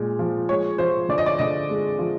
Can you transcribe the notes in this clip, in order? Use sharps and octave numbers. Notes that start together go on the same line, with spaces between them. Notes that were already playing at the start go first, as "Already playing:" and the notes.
Already playing: A#2 G#3
F3
G#3 C#5
F3 C5
D3 D5
D#5
D5
D3 D#5
G#3
F3